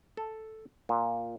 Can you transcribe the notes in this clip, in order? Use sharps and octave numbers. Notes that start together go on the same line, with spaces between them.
A4
A#2